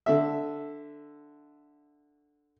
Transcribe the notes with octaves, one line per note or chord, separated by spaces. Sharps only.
D3 E5